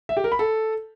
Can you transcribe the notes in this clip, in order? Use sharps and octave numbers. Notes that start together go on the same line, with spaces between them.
E5
G4
A#4
B5
A4